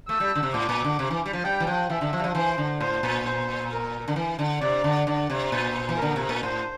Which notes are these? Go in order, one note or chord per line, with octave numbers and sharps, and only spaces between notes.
A3 E6
G3
D3
C3
A2 D6
A#2
D3
C3
E3
G3
F3
G3 G5
E3
F3
E3 E5
D3
F3
G3
F3
E3 C5
D3
A2 C5
A#2
C5
A#4
D3
E3
D3
C3 D5
D3
D3 D5
C3
A#2 C5
E3
D3 A#4
C3
A#2
A2 C5